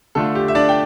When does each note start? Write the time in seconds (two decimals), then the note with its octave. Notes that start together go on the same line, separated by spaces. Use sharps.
0.15 D3 A3 D4 F4 A4
0.35 G4
0.48 E5
0.55 D4 D5
0.69 G5